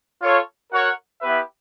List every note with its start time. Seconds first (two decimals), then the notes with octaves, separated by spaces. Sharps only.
0.22 F4 A4 C#5 F5
0.72 F#4 A#4 C#5 F#5
1.21 B3 E4 G4 B4 E5